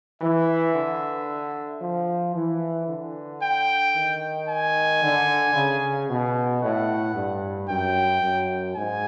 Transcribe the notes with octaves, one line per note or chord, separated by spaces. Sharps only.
E3 E5
D3
F3
E3
D3
G5
D#3
G#5
D3
C#3
B2
A2 F#5
G2
F#2 G5
F#2
G#2 G#5